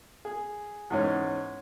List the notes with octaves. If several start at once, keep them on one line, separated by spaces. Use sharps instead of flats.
G#4
E2 G#2 C#4